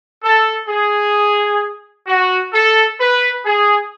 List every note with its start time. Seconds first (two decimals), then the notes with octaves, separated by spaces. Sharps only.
0.23 A4
0.68 G#4
2.07 F#4
2.53 A4
2.99 B4
3.45 G#4